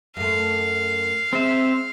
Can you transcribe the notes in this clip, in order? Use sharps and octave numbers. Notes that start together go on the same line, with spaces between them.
F#2 A3 F5
G#3 C4 E5